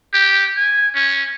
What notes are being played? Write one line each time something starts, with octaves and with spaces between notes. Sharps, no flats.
G4
G#5
C#4